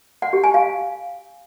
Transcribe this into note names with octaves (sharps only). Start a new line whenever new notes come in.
F#5
G4
G#5
F5